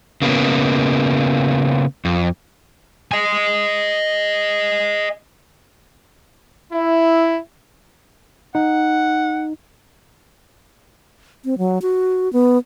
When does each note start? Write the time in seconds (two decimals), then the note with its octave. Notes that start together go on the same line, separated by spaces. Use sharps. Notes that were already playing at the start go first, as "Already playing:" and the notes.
0.22 C#3 A#3 B3
2.05 F2
3.12 D#5 G#5
6.73 E4
8.55 D#4 F#5
11.45 C4
11.58 F#3
11.82 F#4
12.33 B3